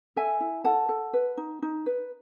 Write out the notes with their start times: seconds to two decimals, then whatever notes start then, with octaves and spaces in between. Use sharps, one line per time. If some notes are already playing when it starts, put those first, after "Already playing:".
0.16 A4 E5 G#5
0.40 E4
0.64 A4 F#5 A5
0.89 A4
1.13 B4
1.37 D#4
1.62 D#4
1.86 B4